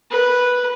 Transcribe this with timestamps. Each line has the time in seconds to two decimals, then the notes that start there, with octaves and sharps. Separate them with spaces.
0.11 B4